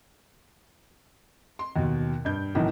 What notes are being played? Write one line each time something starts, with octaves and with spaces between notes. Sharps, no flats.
C6
D#2 B2
G2 G6
B1 A2 D#3 E3